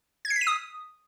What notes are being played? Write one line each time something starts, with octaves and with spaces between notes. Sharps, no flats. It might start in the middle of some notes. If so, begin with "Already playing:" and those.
G#6
C7
B6
D#7
D#6